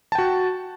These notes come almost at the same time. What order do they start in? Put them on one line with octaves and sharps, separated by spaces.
A5 G5 F#4